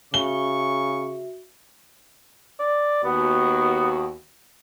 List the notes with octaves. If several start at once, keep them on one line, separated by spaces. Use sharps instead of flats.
C#3 F#4 E5 C#6 G7
D5
D#2 B3 F#4